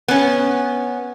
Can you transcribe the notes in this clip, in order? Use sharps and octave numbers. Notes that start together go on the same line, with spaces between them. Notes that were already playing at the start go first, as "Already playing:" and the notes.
B3 C#4